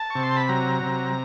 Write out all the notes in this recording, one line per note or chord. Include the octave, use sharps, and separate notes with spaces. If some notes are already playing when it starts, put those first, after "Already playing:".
Already playing: A5
C3 C#6
C6
B5
F#3 A#5
C3